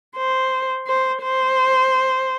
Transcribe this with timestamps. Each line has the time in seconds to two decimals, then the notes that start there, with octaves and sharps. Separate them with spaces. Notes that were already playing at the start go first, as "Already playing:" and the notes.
0.17 C5
0.87 C5
1.23 C5